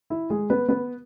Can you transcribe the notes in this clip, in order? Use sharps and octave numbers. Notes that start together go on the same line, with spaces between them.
E4
G#3 G#4
B3 B4
B3 B4